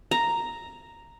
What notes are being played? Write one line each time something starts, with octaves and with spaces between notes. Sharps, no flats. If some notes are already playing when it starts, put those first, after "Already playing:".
A#5